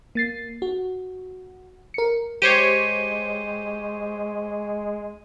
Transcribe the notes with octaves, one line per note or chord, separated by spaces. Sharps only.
A#3 A6 C7
F#4
A#4 C#7
G#3 G4 C5 C#5 D#7